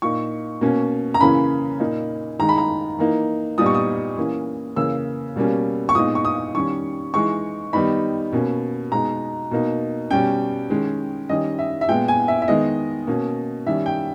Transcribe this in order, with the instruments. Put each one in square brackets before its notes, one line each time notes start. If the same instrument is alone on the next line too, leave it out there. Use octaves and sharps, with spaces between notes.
[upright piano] A#2 A#3 D#4 C#6
B2 A#3 C#4
A#5
C#3 E3 A#3 C#4 B5
A#2 A#3 D#4
D#3 G#3 D#4 A#5
B5
A#5
E3 A#3 D#4
A#2 G3 B3 D#4 D#6
C#6
D#6
E3 A#3 C#4
C#3 E3 A#3 E6
B2 G3 A#3 C#4
C#6
A#2 G#3 B3 D#4 D#6
C#6
D#6
D#3 G3 C#4 C#6
E3 G#3 D#4 C#6
D#3 G3 B3 D#4 B5
B2 A#3 C#4
B2 G#3 B3 D#4 A#5
B2 A#3 D#4
B2 G3 C#4 G5
D#3 G#3 C#4
D#3 G3 C#4 D#5
E5
E5
A#2 G#3 B3 G5
G#5
E5
E5
D#3 G#3 B3 D#5
B2 A#3 C#4
D#3 G3 C#4 E5
G5